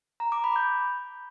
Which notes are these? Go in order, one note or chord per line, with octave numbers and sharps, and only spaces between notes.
A#5
D6
B5
G6